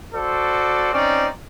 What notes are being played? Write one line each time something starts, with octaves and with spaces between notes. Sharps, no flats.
F#4 A4 C5 D5
C4 C#4 D#4 D5